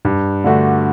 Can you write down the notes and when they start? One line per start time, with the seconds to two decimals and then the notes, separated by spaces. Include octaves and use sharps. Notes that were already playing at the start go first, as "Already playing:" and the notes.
0.05 G2
0.44 D3 A3 D4 F#4